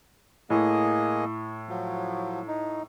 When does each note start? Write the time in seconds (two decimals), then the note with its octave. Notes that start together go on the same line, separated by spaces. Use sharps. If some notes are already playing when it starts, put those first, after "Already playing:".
0.50 A2 A#3 G#4 D#5
1.69 F3 F#3
2.48 D#4